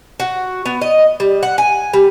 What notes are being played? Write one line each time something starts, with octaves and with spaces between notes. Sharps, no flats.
F#4
B3
D#5
G3
F#5
G#5
G3